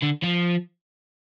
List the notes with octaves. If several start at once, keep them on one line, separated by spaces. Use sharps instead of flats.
D3
F3